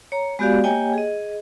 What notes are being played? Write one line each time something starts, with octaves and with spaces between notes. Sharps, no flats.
C#5 A#5
G#3 B3 F#4 G4 D5 F5
A#3 G4 C#5 D#5 G5 G#5
G#4 D#5